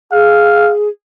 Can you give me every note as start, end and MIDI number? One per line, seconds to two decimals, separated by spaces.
0.12 0.88 68
0.12 0.72 77